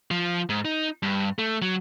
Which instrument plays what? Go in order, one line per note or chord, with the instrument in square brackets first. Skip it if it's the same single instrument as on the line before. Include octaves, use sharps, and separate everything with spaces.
[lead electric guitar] F3
G#2
D#4
G2
A3
F#3